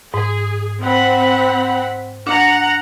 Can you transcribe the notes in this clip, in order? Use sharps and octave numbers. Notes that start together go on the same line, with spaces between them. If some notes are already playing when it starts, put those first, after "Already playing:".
G#2 G#4
C4 F#5 B5
D4 F#5 A#5